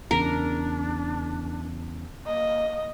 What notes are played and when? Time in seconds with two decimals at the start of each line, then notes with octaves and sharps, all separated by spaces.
0.11 E2 C#3 D4 A#4
2.26 A#3 D#5